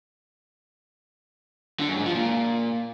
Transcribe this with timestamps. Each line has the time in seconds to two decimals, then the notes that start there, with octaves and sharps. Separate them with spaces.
1.79 D3
1.88 F#2
1.97 G#2
2.06 F3
2.15 A#2